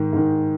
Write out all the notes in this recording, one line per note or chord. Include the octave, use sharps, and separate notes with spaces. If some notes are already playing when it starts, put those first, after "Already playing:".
Already playing: G#2 D#3
G#2 D#3